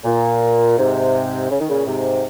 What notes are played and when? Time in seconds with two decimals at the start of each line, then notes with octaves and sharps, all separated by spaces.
0.04 A#2
0.78 G#2 C3
1.51 C#3
1.60 D#3
1.69 A#2 C#3
1.87 G#2 C3